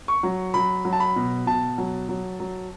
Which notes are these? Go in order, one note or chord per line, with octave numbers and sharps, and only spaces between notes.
C#6
F#3
F#3 B5
F#3
A5
B5
B2
B2 A5
F#3
F#3
F#3